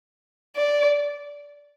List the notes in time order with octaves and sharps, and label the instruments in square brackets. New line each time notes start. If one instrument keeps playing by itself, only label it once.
[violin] D5